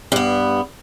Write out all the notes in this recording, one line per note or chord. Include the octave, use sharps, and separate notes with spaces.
G2 B3